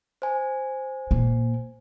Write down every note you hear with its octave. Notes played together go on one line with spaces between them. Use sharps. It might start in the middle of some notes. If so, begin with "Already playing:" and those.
C5 G#5
A#2 A#3